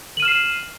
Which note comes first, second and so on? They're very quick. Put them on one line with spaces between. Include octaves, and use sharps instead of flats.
F#7 D#7 F6 E7 C7